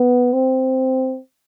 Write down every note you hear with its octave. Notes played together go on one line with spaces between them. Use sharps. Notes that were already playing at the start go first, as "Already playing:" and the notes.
Already playing: B3
C4